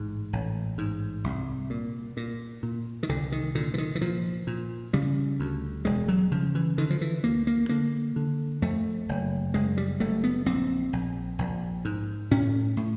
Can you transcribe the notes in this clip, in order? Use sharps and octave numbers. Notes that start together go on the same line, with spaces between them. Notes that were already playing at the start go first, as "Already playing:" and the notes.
Already playing: A1 G#2
A1
G#2
C2
A#2
A#2
A#2
D#3
C2 D3
D#3
A#2 D3
E3
D#3
E3
A#2 F3
A#2
C#3 G3
D2
E1 G#3
F#3
C#3 F3
E3
D3 D#3
F3
E3
D2 A#3
A#3
D3 A#3
D3
F2 A3
F#1
F#1 G#3
G3
F#1 A3
B3
A#1 C4
A#1
A#1
G#2
A2 C#4
A2